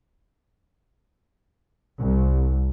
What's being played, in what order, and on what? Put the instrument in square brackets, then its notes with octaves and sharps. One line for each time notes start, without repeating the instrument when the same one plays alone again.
[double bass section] C2